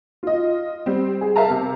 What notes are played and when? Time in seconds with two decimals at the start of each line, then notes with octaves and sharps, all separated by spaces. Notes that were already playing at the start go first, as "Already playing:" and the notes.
0.23 F4 D#5
0.86 G3 C4
1.21 G#4
1.36 A#4 E5 F5 A5 A#5
1.50 C3